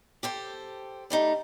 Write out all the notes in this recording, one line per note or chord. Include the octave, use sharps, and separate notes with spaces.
G4 A4 C5
G3 A3 D#4